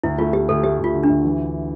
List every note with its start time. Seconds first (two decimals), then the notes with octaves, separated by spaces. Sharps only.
0.04 D2 E4
0.18 A3 F4
0.33 A3 G4
0.49 D2 A4
0.64 A3 G4
0.79 D2 F4
0.94 D3
1.03 D4
1.09 D2
1.24 E3